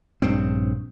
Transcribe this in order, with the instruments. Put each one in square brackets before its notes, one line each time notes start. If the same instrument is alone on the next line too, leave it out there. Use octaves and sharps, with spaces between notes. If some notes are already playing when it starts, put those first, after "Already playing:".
[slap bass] A#1 G2 C#3 C4